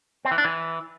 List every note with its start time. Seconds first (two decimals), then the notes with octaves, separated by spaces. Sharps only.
0.25 C4
0.31 E3
0.38 D4
0.45 E3